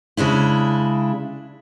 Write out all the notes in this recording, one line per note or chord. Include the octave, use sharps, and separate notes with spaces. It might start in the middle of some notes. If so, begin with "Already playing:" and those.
C#3 G#3 D4 E4